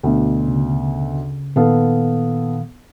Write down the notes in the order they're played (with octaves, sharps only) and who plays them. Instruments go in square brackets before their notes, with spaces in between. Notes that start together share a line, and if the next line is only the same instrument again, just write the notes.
[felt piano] D2 B2
[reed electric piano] C#3
[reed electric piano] A#2 D#3 F5 [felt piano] B3 A4